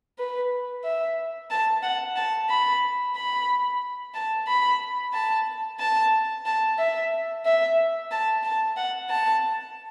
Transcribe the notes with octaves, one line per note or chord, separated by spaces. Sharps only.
B4
E5
A5
F#5
A5
B5
B5
A5
B5
A5
A5
A5
E5
E5
A5
A5
F#5
A5